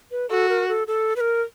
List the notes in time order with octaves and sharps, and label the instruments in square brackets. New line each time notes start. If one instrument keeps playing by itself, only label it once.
[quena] B4
[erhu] F#4 [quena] A4
[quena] A#4
A4
A4
B4
A#4